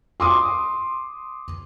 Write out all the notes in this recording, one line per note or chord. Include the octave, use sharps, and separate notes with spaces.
C6 D6 D#6